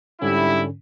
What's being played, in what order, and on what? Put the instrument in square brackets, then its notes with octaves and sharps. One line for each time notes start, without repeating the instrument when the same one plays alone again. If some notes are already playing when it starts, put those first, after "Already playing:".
[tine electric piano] G#2 D3 C#4 [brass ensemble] G3 E4